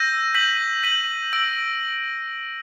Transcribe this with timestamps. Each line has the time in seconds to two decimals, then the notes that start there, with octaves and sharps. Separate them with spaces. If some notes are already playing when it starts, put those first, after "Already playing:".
Already playing: E6 G6 A#6 D#7
0.34 G6 B6 D#7 F#7
0.83 G6 B6 D#7 F#7
1.32 E6 G6 A#6 D7 F#7